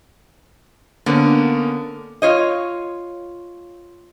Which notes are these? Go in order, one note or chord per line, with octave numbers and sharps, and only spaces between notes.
D3 A#3 B3 C#4
F4 C#5 D#5